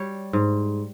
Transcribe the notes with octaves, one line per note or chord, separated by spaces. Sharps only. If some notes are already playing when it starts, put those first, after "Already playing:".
Already playing: G3 C#5
G#2